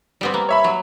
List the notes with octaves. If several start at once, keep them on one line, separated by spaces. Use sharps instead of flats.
G3 B3 C4
A#3
C#5 E5 B5
F#3